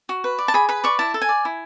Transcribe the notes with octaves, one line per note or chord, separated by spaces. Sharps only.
F#4
B4
D5
A5
G#4 B5
B4 B5
D5 C#6
E4 A5
A4
G#5
D5
E4